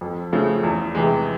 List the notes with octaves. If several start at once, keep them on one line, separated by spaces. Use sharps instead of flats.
F2
C#3 F3 A3
E2
C3 E3 G#3